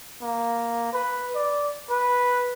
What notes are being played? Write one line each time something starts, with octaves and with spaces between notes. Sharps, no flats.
A#3
B4
D5
B4